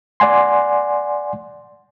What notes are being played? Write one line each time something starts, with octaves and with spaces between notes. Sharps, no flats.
D5 F#5 G#5 C6